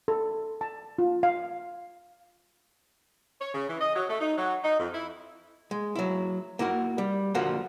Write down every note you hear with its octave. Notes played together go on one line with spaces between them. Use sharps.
A4
A5
F4
F5
C#5
C#3
E3
D#5
F#3
A3
D#4
F#3
D#4
F2
E4
G#3
F#3 E4
A#3 E4 F#4 A#4
G3
D3 F3 A#3 F4 F#4 A4